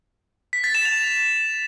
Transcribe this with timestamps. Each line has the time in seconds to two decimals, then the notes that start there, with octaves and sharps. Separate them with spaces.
0.53 B6
0.64 A6
0.75 E7
0.85 F7